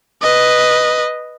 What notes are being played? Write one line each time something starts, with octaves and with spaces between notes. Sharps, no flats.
B4 D#5